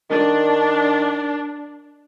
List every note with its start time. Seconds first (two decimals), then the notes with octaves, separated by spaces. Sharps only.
0.10 D#3 D4